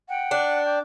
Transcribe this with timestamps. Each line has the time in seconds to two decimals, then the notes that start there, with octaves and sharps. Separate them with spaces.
0.10 F#5 G5
0.31 D4
0.66 G5 D6